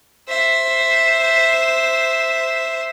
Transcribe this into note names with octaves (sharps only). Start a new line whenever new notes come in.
C5 E5